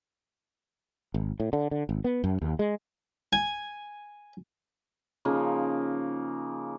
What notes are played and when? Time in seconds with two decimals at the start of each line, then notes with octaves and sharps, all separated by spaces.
1.14 G#1
1.40 A2
1.53 D3
1.71 D3
1.89 G#1
2.04 B3
2.24 F#2
2.42 D#2
2.59 G#3
3.33 G#5
5.25 C#3 F3 A#3 D#4